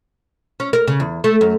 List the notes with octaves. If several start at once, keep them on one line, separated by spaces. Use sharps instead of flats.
C#4
A#4
C#3
E2
A3
F#2